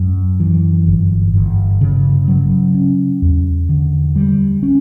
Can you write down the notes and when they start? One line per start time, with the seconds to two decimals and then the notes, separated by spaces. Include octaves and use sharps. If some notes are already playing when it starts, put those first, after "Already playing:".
Already playing: F#2
0.40 E3
0.87 G1
1.33 G1
1.81 C#3
2.28 F#3
2.74 C#4
3.22 E2
3.69 D3
4.16 G3
4.63 C#4